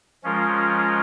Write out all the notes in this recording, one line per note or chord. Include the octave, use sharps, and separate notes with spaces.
F3 G#3 C#4 F4 A#4